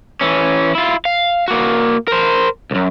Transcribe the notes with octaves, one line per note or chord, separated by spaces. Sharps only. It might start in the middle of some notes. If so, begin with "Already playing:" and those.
E3 C#4
E4 F4
F5
A#3 F#4
A#4 C5
C2 F#2